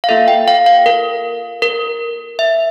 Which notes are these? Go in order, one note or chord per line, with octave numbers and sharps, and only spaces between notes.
F5
A#3 F4 A4 E5
G5
F5
F5
A#4
A#4
E5